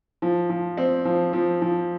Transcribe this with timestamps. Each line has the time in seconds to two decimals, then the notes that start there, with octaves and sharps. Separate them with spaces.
0.22 F3
0.49 F3
0.77 C4
1.05 F3
1.33 F3
1.62 F3